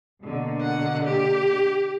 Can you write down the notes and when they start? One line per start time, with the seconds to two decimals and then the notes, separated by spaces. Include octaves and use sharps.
0.22 B2 D3 A#3
0.62 F#5
1.05 G4